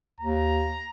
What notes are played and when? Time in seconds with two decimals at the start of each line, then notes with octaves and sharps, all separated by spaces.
0.21 D#2 A#5